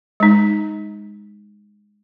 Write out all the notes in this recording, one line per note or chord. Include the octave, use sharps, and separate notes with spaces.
G#3 D#4